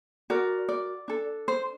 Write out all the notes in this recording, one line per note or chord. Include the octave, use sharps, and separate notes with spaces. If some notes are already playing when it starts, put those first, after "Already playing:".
F#4 A#4 D5
D5
D4 A4
C5